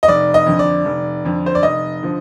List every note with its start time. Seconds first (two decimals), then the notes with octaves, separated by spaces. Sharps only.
0.03 D#5
0.08 F1 D5
0.34 D#5
0.46 F2 D3
0.59 D5
0.85 F1
1.24 F2 D3
1.46 C5
1.55 D5
1.62 F1 D#5
2.03 D3 F3